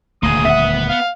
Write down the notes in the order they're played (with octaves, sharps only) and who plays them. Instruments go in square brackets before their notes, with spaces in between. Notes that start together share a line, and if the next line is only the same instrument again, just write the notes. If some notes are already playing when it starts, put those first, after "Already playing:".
[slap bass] D#1 D2 [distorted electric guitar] A#3 G#4 [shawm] D#6
[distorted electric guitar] B3 F#5 [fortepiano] E5
[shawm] F5